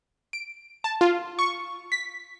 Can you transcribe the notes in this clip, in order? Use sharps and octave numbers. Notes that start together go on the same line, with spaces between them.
D7
A5
F4
C#6
B6